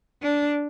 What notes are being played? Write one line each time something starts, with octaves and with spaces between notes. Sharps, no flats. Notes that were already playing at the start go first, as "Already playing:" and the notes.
D4